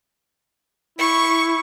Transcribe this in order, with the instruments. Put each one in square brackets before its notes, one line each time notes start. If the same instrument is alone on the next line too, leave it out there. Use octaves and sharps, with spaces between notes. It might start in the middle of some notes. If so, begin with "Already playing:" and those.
[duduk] E4 [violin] C#6